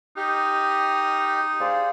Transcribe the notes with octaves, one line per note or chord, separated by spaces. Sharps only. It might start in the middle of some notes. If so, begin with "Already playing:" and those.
D#4 G4 D#5 F6
G#4 C5 D5 F5